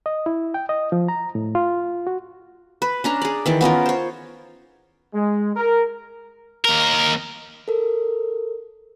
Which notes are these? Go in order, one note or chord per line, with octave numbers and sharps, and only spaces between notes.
D#5
E4
G5
D#5
F3
A#5
A2
F4
F#4
B4
C#4 D4 A#5
G#4 D5
D#3 E3 D5
B3 C#4 F4 A#4
C5 C#5
G#3
A#4
D#2 A#4
A4 A#4